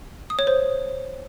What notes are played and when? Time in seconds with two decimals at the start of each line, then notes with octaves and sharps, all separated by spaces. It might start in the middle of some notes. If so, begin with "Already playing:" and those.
0.30 D#6
0.39 C#5
0.47 C5